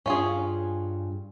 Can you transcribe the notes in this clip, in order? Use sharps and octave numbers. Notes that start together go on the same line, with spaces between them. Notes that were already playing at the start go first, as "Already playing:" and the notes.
G2 C#4 F4 G#4